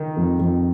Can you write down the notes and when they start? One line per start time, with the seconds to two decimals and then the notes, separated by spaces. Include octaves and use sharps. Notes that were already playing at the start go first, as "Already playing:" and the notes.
Already playing: D#3
0.17 F2
0.39 F2